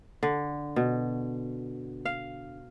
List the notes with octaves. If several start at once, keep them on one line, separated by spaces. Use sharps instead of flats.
D3
B2
F5